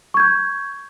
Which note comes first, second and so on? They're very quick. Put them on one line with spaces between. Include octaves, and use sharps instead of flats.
C#6 G#6 G6